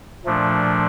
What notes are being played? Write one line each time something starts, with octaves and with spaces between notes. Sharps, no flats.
A#2 F3 A3 D4